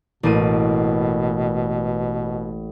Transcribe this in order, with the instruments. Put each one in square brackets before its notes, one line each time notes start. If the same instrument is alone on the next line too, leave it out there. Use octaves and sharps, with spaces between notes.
[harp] A1 A#3 D#7 [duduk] B2